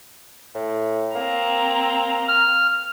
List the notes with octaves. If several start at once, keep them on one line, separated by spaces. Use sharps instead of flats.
A2
A#3 C4 A#5
F6